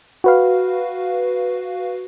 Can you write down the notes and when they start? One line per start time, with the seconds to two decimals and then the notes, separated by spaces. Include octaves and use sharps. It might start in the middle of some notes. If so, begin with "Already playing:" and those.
0.24 F#4 B4 F5